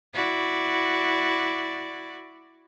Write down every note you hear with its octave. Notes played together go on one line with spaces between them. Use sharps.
E4 F#4 D5